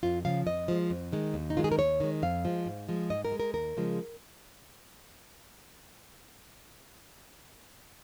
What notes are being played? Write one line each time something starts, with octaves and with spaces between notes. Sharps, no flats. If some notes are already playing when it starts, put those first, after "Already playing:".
F2 F4
C#3 F3 F5
F2 D#5
F3 G#3
F2
D#3 G#3
D#2
D#4
D#3 G#3 F4
G#4
A#4
D#2 C#5
D#3 G#3
F2 F5
F3 G#3
G#2
F3 G#3
G#2 D#5
A#4
G#3
A#4
D#2 A#4
C#3 F3 G#3